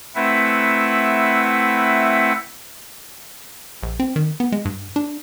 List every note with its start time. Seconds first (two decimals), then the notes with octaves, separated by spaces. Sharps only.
0.15 A3 C4 E4 B4 E5 F#5
3.83 A#1
4.00 C4
4.16 D#3
4.40 B3
4.52 G#3
4.65 G2
4.96 D4